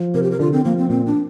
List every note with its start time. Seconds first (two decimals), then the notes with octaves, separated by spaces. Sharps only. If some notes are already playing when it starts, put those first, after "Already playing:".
Already playing: F3
0.14 C3 A#4
0.23 G4
0.31 A#4
0.39 D3 F4
0.53 C4
0.65 F3 A#3
0.78 C4
0.90 A#2 C4
1.06 D4